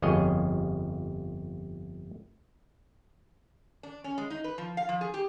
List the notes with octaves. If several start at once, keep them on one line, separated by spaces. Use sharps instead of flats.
G1 F2 G#4 C#5 D#5
D4
C#4
G#3
D#4
B4
F3
F5
F3
G#4
G4